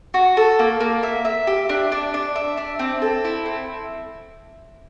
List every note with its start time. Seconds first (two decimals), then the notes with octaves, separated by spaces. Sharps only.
0.14 F#4
0.37 A4
0.59 A#3
0.80 A#3
1.03 E5
1.25 E5
1.47 G4
1.69 D4
1.92 D4
2.14 D4
2.35 E5
2.57 D4
2.79 C4
3.02 A4
3.25 E4
3.46 C4